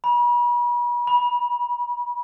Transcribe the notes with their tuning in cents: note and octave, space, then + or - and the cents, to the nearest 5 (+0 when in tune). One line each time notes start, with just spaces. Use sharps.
B5 -40
B5 -20